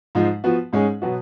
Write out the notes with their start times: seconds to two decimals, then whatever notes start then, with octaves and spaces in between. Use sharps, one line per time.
0.15 G#2 F3 G#3
0.44 F3 B3 F#4
0.73 G#2 G#3 C#4 G#4
1.02 B2 F#3 B3 F#4